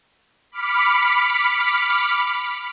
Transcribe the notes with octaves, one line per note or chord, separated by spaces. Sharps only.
B5 D6 F6 B6 C#7